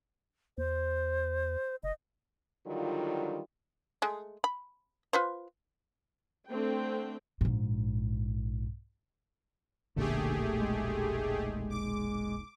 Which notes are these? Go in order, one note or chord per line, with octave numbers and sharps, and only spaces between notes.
E2 C5
F#1 D#5
D3 D#3 F#3 G3 F4
G#3 A3
B5
F4 B4 C5
D3 A3 C4 G5
A#1 G#2
F1 B1 A#2 D3 A3 G4 G#4
G#3
D6